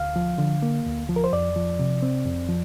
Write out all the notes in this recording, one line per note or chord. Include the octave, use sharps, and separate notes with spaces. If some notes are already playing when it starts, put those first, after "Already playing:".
Already playing: D2 F5
F3
D3
A#3
D2
F3
A#4
C5
F2 D5
F3
C3
C4
F2
F3